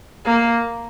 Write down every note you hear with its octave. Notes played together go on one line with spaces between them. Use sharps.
A#3